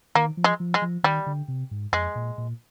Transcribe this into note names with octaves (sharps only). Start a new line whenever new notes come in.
D#3 A#3
F3
G#3
F3
G#3
F3
D#3 G3
D3
C3
G#2
F2 G#3
A#2
A#2